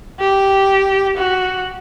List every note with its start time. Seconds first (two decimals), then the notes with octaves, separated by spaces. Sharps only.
0.20 G4
1.17 F#4